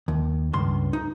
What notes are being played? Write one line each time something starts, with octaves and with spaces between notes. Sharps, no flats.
D#2
C#2 G2 C6
D#4